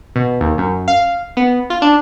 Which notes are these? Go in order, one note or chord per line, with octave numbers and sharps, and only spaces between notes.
B2
D#2
F#2
F5
B3
F4
D4